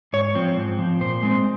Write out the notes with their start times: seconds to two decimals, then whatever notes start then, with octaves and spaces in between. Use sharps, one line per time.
0.13 G#2 C#5
0.35 F3 C4
0.57 G#2
0.79 F3 C4
1.01 A#2 C5
1.23 G#3 C4